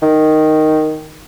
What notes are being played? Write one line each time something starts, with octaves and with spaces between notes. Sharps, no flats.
D#3